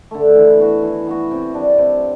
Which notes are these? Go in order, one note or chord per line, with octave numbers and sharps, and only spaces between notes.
D3 A3
E3
B3 F#4
E3
B3 F#4
C3
G3 D4
C3